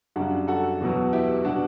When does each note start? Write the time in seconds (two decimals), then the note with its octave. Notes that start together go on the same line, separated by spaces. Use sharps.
0.16 F#2 C#3 G3 D4 F#4
0.48 F#4 A4
0.80 E2 B2 F#3
1.13 E4 G4
1.45 B2 G3 D4 F#4